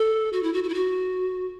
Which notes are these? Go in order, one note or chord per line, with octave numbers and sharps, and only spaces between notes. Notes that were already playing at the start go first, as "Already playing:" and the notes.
Already playing: A4
F#4
E4
F#4
F#4
E4
F#4